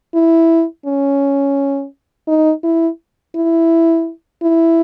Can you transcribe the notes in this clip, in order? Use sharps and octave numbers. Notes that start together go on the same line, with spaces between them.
E4
C#4
D#4
E4
E4
E4